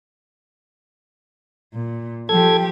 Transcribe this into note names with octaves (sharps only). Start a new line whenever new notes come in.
A#2
F3 G4 A4 G#6